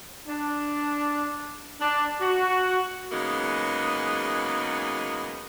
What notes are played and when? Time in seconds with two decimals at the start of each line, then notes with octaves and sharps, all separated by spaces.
0.28 D4
1.81 D4
2.21 F#4
3.12 C#3 F#3 G#3 A#3 B3 D#4